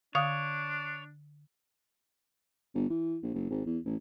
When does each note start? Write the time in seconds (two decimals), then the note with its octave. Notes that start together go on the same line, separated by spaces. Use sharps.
0.15 D3 D4 C#5 F5 D#6
2.75 G1
2.90 E3
3.23 A#1
3.34 F#1
3.50 G#1
3.66 E2
3.85 A1